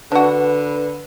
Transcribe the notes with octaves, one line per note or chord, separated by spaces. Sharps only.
D3 D4 F#4 B4